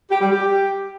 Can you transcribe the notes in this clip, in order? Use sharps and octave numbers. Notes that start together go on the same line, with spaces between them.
G4
G3
G4